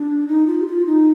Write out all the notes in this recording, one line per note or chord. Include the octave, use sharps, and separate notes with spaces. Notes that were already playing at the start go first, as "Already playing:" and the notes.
Already playing: D4
D#4
F4
G4
F4
D#4